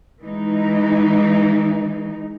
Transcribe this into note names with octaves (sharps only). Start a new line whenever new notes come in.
E3 G#3 D#4